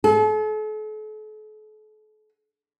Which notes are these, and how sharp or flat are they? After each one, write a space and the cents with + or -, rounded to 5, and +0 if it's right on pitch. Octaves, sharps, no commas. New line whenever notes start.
A4 -45